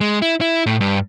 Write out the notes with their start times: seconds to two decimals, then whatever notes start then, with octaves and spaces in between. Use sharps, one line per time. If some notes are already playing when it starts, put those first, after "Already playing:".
0.01 G#3
0.22 E4
0.41 E4
0.66 A2
0.81 G2